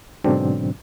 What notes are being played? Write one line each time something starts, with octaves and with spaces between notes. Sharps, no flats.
G#2 B2 D3 F#3 C4 D4